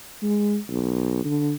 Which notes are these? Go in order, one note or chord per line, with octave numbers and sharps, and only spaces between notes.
G#3
B1
D3